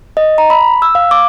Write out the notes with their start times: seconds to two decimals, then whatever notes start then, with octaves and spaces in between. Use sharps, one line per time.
0.17 D#5
0.38 A#5
0.50 B5
0.82 E6
0.95 F5
1.11 D6